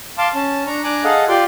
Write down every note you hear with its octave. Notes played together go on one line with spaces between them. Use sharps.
F5 A5 C6 D6
C#4 A5
D4 A#5 C#6
D4 G#5 A#5 D6 F#6
G#4 A4 D#5 F5 F#5
F4 G4 D5 C6 D6